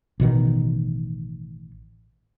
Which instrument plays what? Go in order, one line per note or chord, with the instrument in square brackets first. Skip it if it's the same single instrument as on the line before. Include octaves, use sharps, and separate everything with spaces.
[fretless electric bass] A1 B2 D#3